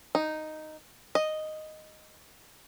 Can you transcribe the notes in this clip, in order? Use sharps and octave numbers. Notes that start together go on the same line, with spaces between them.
D#4
D#5